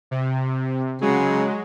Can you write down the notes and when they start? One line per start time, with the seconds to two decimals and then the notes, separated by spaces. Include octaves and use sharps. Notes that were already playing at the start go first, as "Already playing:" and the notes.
0.11 C3
1.01 C#3 F#3 G#3